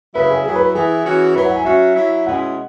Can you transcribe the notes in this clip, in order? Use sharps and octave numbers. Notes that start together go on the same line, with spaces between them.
C#3 F#3 E4 B4
G#4
F#3 E4 G#4
B4
E3 B3 E4 G#4
E3 C#4 F#4
F#3 E4 B4
F#5
G#5
F#3 C#4 F#4 E5
F#3 E4
B2 G#3 C#4 E4 F#5